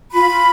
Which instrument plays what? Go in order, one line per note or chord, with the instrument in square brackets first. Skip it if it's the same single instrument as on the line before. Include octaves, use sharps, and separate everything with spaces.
[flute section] F4 B5
F4